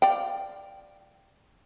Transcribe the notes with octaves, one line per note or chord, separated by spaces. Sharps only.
D5 F5 G5